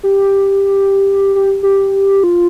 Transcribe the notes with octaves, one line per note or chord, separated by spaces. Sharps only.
G4
G4
G4
F4